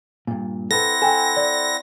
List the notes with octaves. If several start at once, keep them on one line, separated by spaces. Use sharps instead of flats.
G2 A#2
C4 E4 A4 B4 F#5 A#6
A4 G5 G#5
D5